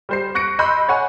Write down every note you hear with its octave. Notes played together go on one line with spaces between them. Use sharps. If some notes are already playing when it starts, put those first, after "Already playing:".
G3 C5 C7
C#6 F#6 A#6 C#7 D7
D#5 B5 C6 E6 F#6 G6
C#5 F#5 G#5